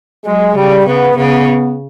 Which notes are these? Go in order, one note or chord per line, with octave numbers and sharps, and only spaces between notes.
F#3 G#3
C#3 G3
C#3 B3
C#3 B3